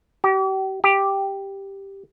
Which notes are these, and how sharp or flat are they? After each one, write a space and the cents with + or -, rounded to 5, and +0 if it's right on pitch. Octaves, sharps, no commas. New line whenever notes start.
G4 -40
G4 +0